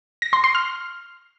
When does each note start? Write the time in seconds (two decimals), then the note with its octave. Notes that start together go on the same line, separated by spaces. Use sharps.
0.22 A#6
0.33 C6
0.44 C6
0.55 F6